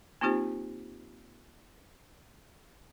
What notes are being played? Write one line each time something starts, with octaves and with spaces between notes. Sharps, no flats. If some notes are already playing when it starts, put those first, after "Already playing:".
A#3 C4 D#4 F4 G4 C5